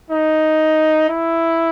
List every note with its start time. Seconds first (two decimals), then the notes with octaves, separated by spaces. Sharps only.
0.10 D#4
1.10 E4